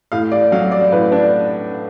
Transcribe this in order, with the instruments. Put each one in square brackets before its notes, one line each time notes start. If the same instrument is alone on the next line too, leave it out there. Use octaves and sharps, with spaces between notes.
[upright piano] A2 F5
D5
F#3 F5
D5
A2 B4
D4